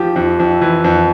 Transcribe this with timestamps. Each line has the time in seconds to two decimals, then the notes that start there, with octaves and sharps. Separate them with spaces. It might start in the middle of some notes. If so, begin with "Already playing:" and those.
Already playing: F3 G4
0.16 F2
0.39 F2
0.61 E3
0.84 F2